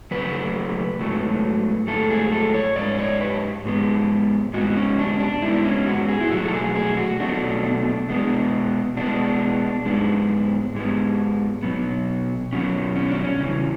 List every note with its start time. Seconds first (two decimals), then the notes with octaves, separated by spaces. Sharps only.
0.11 F#2 C#3 F#3 A3 B4
0.99 G#2 F#3 A3
1.88 G#2 F#3 A3 A4
2.10 G#4
2.32 A4
2.54 C#5
2.76 G#2 G#3 D5
2.99 C#5
3.21 B4
3.65 G#2 G#3 B3
4.53 G#2 G#3 B3 F#4
4.76 C#4
4.99 D4
5.20 D4
5.42 G#2 G#3 B3 E4
5.65 C#4
5.87 F#4
6.08 G#4
6.20 E4
6.31 B2 F#3 A3 F#4
6.45 A4
6.54 G#4
6.76 G#4
6.97 F#4
7.20 B2 F#3 A3 D4
8.09 B2 G#3 B3
8.97 B2 G#3 B3 D4
9.86 G#2 G#3 B3
10.75 G#2 G#3 B3
11.63 B2 F#3 B3
12.52 B2 F#3 B3 C#4
12.96 C#4
13.11 D4
13.24 C#4
13.41 E2 C#3 E3